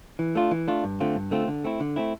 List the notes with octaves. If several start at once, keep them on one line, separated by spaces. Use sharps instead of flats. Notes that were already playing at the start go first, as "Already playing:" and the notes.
E3
A3 D4 F4
E3
A3 D4 F4
G2
D3 A3 C4 F4
G2
D3 A3 C4 F4
D3
A3 C4 E4
D3
A3 C4 E4